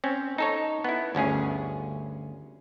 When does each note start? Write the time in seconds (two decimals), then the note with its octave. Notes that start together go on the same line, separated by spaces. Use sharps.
0.04 C4 C#4
0.38 D#4 A4 C#5
0.84 B3 E4
1.15 G1 D2 C#4 G#4